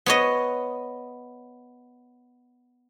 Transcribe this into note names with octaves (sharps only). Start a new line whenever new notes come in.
B3 C#5 D#5